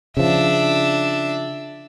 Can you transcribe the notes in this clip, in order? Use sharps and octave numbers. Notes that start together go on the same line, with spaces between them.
C#3 F3 D4 E5